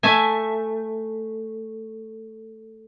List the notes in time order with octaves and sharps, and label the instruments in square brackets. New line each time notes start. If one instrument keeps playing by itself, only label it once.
[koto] A3 E5 G#5